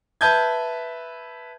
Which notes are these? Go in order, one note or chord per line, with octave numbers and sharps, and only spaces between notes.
B4 E5 A5 G6 G#6